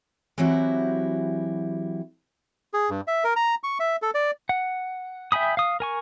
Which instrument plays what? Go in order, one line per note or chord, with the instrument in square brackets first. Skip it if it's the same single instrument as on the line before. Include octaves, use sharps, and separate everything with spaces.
[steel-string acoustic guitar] E3 F#3 C4 E4 F#4 G4
[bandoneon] G#4
G2
E5
A#4
A#5
C#6
E5
A4
D5
[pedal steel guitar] F#5
E5 G5 G#5 B5 D#6
F5 D#6
A#4 G#5 C#6